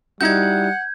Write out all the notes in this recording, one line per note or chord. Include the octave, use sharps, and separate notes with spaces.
G3 D#4 E4 F#4 F#5 G6 G#6